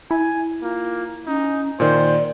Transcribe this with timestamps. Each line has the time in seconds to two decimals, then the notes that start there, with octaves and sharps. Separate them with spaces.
0.11 E4 G#5
0.62 A#3 F4
1.27 C#4 D#4
1.80 A#2 D#3 C5 D5